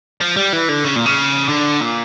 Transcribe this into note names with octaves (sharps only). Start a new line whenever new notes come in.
F3
G3
E3
D3
C#3
A#2
C#3
D3
A#2